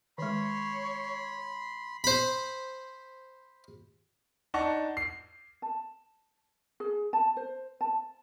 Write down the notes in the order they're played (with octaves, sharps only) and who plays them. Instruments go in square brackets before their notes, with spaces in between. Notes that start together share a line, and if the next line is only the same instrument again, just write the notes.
[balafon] D#3 G#3 [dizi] C#5 [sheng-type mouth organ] B5 C6
[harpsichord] C5 B5
[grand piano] D4 D#4 F#5 A5 C#6
C7
[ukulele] A5
G#4
A5
C5
A5